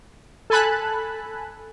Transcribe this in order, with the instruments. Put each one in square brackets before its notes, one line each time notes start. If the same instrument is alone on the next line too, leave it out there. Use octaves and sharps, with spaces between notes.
[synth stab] A4 G#5 A5 B5 F#6